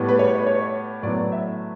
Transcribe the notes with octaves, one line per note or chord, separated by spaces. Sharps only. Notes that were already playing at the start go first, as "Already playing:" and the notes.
Already playing: A2 G3 B3
B4
C#5
B4
C#5
A2 F#3 B3 D5
E5